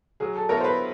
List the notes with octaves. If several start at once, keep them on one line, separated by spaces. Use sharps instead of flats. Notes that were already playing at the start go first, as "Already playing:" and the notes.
F#3 G#4
A4
B3 E4 A4 A#4 C#5
C5
B4